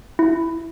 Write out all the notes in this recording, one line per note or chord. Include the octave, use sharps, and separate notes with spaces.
E4